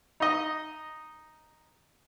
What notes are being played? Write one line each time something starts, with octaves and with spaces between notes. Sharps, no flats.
D#4 D#5